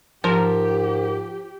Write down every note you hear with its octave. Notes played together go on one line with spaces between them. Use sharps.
G#2 F3 G4 A#4